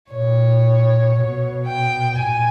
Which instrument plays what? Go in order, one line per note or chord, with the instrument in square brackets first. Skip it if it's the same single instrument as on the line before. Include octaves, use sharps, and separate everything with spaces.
[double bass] A#2 [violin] C#5
[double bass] B2
[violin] G5
[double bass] A#2 [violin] G#5